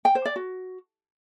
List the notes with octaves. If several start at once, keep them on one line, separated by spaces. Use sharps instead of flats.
G5
C5
D5
F#4